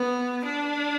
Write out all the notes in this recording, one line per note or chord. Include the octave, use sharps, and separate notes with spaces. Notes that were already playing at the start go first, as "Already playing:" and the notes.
Already playing: B3
D4